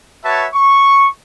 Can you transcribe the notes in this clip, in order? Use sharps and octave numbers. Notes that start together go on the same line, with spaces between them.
F#4 B4 C#5 E5 A5
C#6